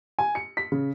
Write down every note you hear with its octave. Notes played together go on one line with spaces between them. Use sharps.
G#5
C#7
B6
C#3